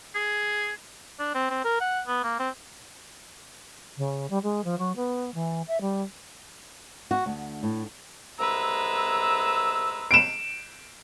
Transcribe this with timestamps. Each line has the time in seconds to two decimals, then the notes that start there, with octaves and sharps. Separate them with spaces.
0.15 G#4
1.19 D4
1.35 C4
1.50 C4
1.64 A#4
1.81 F#5
2.07 B3
2.23 A#3
2.39 C4
3.97 C#3
4.29 G3
4.43 G#3
4.64 F3
4.78 F#3
4.95 B3
5.34 E3
5.67 E5
5.80 G3
7.11 F#4
7.26 D2
7.63 A2
8.39 C2 G#3 B4 A#5 E6
10.11 D7 E7